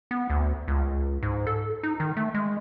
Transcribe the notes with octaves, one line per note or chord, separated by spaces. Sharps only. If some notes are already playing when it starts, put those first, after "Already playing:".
B3
D2
C#2
G#2
A4
D#4
D#3
A3
G#3